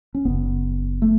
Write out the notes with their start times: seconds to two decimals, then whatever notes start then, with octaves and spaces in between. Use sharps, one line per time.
0.15 C#4
0.25 F#1 F#2 C#3 B3
1.02 A3